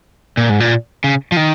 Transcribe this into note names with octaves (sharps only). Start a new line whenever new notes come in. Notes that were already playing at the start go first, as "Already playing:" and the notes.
A#2
G#2
A#2
C#3
F3
D#3